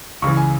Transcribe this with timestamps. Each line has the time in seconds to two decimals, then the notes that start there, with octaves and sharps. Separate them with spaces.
0.22 C#2 C#3 E3 C#6
0.37 G#5